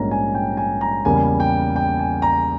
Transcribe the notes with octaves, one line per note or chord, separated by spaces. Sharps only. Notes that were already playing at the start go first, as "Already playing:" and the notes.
Already playing: A#1 G#2 G3 A#3 C#4 A#5
G#5
G5
G#5
A#5
E2 C#3 G3 A#3 G#5
G5
G5
G#5
A#5